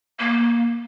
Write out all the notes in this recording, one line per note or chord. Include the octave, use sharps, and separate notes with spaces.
A#3